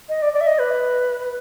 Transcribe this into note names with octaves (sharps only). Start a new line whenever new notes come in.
D#5
D5
D5
E5
D#5
B4